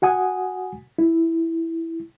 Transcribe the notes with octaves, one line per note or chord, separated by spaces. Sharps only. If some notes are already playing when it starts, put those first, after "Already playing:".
F#4 F#5 G#5 D#6
E4